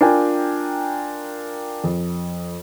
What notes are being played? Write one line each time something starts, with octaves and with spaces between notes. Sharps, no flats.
D4 F4 A#4 G5 G#5
F2